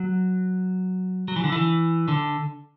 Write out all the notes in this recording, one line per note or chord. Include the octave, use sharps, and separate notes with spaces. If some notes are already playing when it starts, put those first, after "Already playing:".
Already playing: F#3
F#3
E3
D3
E3
D3